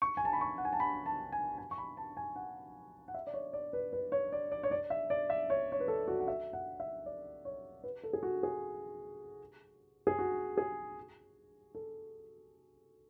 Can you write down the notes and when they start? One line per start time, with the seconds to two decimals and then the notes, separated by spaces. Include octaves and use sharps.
0.02 C#6
0.17 G#5
0.25 A5
0.33 B5
0.41 C#6
0.58 F#5
0.65 G#5
0.73 A5
0.80 B5
1.06 A5
1.32 G#5
1.58 G#5
1.71 C#6
1.78 B5
1.97 A5
2.17 G#5
2.36 F#5
3.08 F#5
3.14 E5
3.27 D5
3.34 C#5
3.53 D5
3.73 B4
3.93 B4
4.12 C#5
4.32 D5
4.52 D5
4.63 C#5
4.71 D5
4.90 E5
5.10 D5
5.30 E5
5.50 C#5
5.72 C#5
5.80 B4
5.88 A4
6.08 F#4
6.20 F#5
6.28 E5
6.53 F#5
6.80 E5
7.06 D5
7.45 C#5
7.84 B4
8.03 A4
8.13 G#4
8.23 F#4
8.43 G#4
10.07 G#4
10.19 F#4
10.58 G#4
11.75 A4